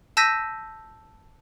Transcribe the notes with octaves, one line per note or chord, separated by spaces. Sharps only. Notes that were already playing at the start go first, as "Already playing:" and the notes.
A5 E6 G6 A#6 B6 D#7